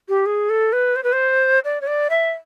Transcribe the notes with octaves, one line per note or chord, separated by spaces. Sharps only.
G4
G#4
A4
B4
C5
B4
C5
D5
C#5
D5
E5